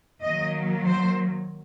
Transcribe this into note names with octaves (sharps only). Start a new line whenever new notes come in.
D#3 F#3 A#3 D#5
C5